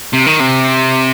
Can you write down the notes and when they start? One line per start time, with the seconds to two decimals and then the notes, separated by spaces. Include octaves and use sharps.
0.13 C3
0.27 D#3
0.40 C3